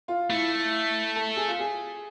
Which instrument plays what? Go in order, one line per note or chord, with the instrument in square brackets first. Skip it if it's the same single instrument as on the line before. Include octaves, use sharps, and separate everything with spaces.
[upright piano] F4
[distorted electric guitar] A3 [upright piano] E4
[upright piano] A4
G#4
F4
G#4